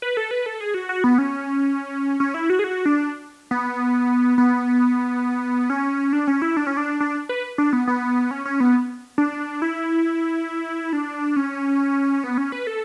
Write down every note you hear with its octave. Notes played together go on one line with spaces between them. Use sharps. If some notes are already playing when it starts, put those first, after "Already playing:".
B4
A4
B4
A4
G#4
F#4
F#4
B3
C#4
C#4
E4
F#4
G#4
F#4
D4
B3
B3
C#4
D4
C#4
E4
D4
C#4
D4
D4
B4
D4
B3
B3
C#4
C#4
B3
D4
E4
D4
C#4
B3
C#4
B4
A4